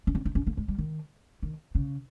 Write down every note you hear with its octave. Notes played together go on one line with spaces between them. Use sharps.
C#4
C4
D#4
C#4
A#3
G#3
G3
D#3
D#3
C#3